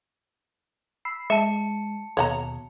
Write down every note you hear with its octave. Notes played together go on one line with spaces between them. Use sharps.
B5 E6 C7
G#3 E5 A5 C#7
D#2 B2 C#5 F#5 A#5